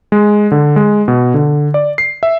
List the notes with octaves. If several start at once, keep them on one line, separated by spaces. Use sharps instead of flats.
G#3
D3
G#3
B2
D3
D5
C7
E5